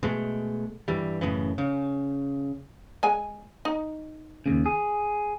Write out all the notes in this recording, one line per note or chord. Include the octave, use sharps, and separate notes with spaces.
B2 G#3 A3
G2 E3 G3
F#2 A2 C#3 E3
C#3
G#3 G#5
D#4
D#2 A2 C#3
G#4